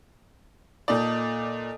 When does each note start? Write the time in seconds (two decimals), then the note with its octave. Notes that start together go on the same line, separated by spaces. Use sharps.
0.88 A#2 D#4 A4 D5